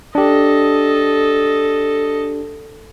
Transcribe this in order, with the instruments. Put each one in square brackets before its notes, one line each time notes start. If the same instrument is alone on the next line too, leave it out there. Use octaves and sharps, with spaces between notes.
[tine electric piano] D4 G4 [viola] A4 D#5